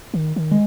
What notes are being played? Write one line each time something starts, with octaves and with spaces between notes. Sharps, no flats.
D#3
D#3
G#3